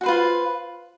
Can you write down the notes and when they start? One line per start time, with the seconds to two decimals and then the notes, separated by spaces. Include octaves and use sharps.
0.01 F#4
0.03 C5
0.06 B4
0.08 F4